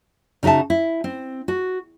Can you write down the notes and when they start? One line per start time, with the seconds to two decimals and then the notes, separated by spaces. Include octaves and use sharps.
0.43 C#3 D#4 F#4 E5 A5
0.70 E4
1.04 C4
1.48 F#4